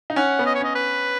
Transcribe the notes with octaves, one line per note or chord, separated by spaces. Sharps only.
D#4
C#4 F#5
B3
D#5
C#5
C#4 D#5
B4